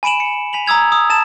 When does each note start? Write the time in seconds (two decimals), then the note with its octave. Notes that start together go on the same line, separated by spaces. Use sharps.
0.03 G#5 B5 D7 E7 F#7
0.20 C#7
0.53 G#5 B6 F7 F#7
0.66 A#5 D#6 E6 G#6 F7
0.92 D#6 E6
1.10 A5 A6 E7